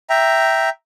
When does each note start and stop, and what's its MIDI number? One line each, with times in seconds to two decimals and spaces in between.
0.10 0.69 76
0.10 0.69 79
0.10 0.69 82